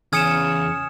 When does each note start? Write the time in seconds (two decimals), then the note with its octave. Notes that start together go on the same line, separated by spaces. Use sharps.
0.13 E2 C#3 G#5 D#6 F6 G#6 C#7 E7